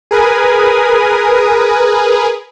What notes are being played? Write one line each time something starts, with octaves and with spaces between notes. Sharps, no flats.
G#4 A#4 B4 G#5 D#6